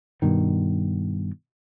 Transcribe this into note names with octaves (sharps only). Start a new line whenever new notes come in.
G2 B2 D#3